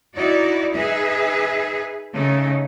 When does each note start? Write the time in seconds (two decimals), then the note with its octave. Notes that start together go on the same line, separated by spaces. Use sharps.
0.15 D#4 E4 F#4 D5
0.75 D#4 G#4 B4 E5
2.13 C#3 A3 D#4